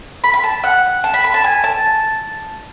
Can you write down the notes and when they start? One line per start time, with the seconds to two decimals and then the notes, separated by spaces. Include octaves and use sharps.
0.24 B5
0.34 B5
0.44 A5
0.64 F#5
1.04 A5
1.14 B5
1.24 B5
1.34 A5
1.44 G#5
1.64 A5